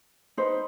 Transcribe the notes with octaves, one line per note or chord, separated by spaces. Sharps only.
D#4 B4 C5